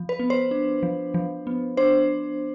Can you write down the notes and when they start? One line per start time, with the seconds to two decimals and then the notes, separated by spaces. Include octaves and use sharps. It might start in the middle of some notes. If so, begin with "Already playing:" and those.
Already playing: F3
0.09 B4
0.19 B3
0.30 C5
0.51 D4
0.83 F3
1.14 F3
1.47 B3
1.77 D4 C5